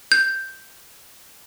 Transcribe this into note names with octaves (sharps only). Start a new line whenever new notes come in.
G6